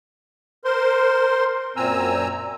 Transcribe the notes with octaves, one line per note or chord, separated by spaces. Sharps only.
A#4 C5 C6
F#2 A#2 C4 G#5 A#5 E6